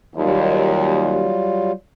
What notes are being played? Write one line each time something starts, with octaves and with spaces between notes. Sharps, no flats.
D#2 F#3 G3 F4